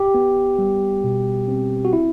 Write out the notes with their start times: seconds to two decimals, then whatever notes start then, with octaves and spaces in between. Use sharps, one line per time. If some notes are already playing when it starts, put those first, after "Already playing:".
Already playing: G4
0.14 B3
0.58 G3
1.04 B2
1.48 C4
1.85 F#4
1.93 E4